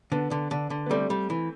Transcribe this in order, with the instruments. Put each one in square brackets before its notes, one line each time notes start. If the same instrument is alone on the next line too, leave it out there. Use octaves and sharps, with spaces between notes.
[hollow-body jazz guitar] D3 [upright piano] B3 D4
[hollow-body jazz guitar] D3
D3
D3
[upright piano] B3
[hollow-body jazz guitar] G3 [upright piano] A3 C4
[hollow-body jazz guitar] G3
E3